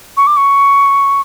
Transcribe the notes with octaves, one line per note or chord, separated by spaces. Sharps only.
C#6
D6
C#6